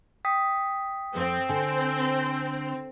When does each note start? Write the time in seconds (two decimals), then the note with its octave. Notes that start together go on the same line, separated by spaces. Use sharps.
0.25 G5 D#6 B6
1.15 F2 C4
1.49 D3 G#5